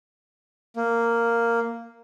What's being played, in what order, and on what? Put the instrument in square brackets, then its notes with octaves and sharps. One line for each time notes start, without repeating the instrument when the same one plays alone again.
[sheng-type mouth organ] A#3